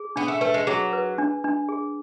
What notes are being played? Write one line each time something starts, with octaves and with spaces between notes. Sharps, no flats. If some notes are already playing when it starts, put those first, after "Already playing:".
Already playing: G#4
B3 D4
A3
A3 B4
G#3
F#3 G#4
B4
D4
D4
G#4